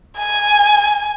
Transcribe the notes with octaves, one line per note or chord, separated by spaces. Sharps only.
G#5